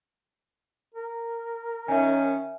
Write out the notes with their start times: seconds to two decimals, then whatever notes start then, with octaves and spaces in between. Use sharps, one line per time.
0.94 A#4
1.88 D#3 C#4 E5 G#5